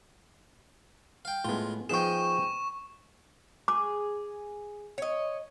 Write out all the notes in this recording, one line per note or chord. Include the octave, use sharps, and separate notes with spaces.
F5 G5
A2 G#3 B3 F4
F3 B3 D#4 G#4 G5 C#6 E7
G#4 D6
C#5 D#5